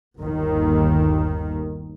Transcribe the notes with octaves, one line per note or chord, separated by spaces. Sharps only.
G1 D#2 D#3